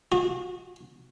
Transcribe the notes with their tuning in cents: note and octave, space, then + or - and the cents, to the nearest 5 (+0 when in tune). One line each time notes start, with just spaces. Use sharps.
F#4 -40